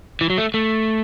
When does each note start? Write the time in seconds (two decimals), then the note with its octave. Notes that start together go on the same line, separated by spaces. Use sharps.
0.21 E3
0.30 F#3
0.38 A3
0.54 A3